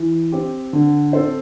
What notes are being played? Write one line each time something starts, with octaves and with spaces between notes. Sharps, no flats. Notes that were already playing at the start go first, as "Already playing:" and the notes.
Already playing: E3
C4 G4
D3
C4 A4 C5